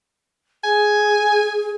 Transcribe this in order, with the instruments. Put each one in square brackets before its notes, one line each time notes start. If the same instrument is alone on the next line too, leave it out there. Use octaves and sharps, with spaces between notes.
[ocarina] G#4 [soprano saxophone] G#5